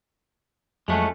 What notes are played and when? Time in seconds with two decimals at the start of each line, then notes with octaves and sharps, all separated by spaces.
0.88 F2 F#3 G#3 A3 C#4 F#6